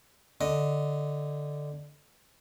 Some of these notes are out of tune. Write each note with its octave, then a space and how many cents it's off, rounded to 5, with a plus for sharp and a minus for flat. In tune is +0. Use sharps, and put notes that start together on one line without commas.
D3 +0 D#5 +0